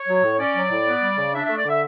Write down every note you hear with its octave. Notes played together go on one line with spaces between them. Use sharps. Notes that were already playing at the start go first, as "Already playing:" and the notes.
Already playing: C#5
F#3
A2
C#4 D5
F#3
A2
B3
G3
C#3
D4 E5
A3 E5
D5
D3 E5